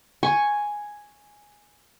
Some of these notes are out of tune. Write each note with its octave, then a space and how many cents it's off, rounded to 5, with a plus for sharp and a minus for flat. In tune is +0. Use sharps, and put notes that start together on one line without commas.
G#5 +0 C#6 +0